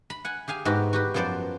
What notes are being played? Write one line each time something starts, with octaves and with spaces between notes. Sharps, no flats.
B5
F#5 G#5
G4 G#4 F5 G#5
G#2 B3 F#4 G4
F#4 G4 B4
F#2 F3 B3 C5 D5